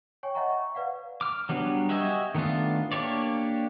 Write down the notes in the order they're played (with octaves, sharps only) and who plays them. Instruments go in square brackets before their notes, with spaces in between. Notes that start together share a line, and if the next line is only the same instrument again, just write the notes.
[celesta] C#5 G5 G#5 C#6
C#5 D#5 E5 F#5 A#5 C#6
C#6
B4 D5 F5 F#5
[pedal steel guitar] D6 F6
F#3 G3 B3 D4
F#4 G4 D#5 E5 G#5
D#3 A3 B3 D4 F4
A#3 D4 G4 C#5 D5